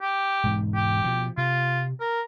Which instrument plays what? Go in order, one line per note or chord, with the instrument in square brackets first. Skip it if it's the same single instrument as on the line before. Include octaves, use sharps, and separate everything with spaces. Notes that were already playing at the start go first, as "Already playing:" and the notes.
[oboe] G4
[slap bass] E1 G#2
[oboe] G4
[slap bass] B2 F3
[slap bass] C3 [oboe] F4
[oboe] A#4